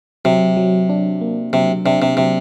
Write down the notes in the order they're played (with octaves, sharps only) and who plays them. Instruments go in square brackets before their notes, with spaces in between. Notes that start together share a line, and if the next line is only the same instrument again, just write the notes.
[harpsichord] C3 [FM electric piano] F#3
[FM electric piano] F#3
D4
A#3
[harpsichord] C3 [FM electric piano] F#3
[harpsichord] C3 [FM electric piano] D4
[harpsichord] C3
[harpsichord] C3 [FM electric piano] F#3